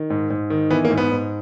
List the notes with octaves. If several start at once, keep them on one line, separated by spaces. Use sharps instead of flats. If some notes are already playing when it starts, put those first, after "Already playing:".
Already playing: D#3
G#2
G#2
D#3
E3 B3
A#3
G#2
B3
G#2